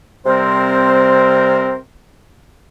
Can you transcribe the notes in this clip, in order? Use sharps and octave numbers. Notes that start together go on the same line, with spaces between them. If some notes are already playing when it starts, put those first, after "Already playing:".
C3 G3 C4 A#4 C5